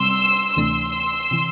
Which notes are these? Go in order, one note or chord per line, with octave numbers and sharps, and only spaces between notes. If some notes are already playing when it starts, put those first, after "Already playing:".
Already playing: C3 G3 C4 C6 E6
D2 C3 E3 A3 D4 C6 E6
C3 E3